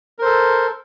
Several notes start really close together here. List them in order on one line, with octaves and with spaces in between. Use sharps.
A#4 C5 A4